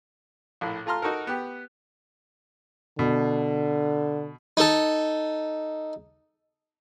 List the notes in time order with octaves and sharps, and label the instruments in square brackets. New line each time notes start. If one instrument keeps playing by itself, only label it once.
[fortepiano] A#1 A2
A3 F4 A5 A#5 C6 F6
D#4 F#4 A4 A#4
B3 G4
[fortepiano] B2 [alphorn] D3
[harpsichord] D#4 A4